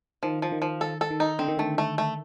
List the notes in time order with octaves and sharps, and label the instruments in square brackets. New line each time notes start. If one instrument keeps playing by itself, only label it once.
[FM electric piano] D#3 [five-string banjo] F3
[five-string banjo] F3
[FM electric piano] D#3
[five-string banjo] F3
A4
A4
[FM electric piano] D#3
[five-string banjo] D#4
[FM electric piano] D3 [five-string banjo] C4
[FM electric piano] D#3
[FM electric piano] D3 [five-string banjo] A3
[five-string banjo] A3
A3